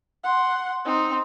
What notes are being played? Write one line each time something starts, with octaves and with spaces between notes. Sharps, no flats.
F#5 C6
C4 D#4